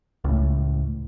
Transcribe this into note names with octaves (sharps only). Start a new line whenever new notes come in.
C#2 A2